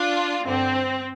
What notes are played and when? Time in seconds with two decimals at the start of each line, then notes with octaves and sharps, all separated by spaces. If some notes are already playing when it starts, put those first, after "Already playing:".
Already playing: D4 F4
0.45 G2 D3 C4